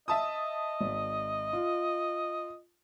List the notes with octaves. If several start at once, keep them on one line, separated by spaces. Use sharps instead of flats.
D#5 E5 A5 D#6
G#1
F4